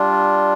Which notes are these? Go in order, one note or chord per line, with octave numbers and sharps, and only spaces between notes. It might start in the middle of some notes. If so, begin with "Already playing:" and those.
Already playing: G3 D4 F4